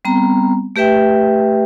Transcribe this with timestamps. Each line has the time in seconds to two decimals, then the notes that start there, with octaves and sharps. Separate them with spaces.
0.05 G3 B3 C4 A#5
0.76 A3 G4 B4 E5 G5